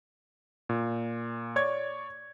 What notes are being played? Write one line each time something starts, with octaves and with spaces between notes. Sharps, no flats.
A#2
C#5 D5 C#6 G#6